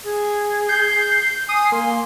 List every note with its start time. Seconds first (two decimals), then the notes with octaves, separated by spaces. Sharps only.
0.04 G#4
0.69 G6 C7
1.49 G#5 D#6 C7
1.72 A#3 C6